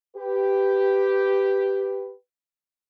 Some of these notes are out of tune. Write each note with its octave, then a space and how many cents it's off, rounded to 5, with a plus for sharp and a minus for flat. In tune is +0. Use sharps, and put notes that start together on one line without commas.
G4 +0 B4 +10